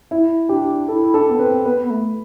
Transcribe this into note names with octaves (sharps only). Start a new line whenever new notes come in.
E4
D4 G4
E4 A4
D4 A4
B3
C4 B4
B3 B4
B3
A3